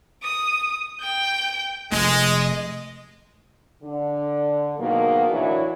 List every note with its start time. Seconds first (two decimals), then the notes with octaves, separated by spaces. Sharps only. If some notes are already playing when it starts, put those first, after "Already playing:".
0.23 D#6
1.00 G5 G6
1.92 F1 G#3 A3 D#5
3.83 D3
4.79 G#2 B2 D#3 F#3 A#3
5.31 A2 E3 F#3 D4 E4